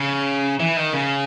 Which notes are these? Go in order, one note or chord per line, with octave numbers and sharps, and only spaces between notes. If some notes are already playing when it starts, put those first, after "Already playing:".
Already playing: C#3
E3
D#3
C#3